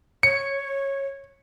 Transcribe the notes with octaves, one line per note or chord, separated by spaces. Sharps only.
C#5 C#7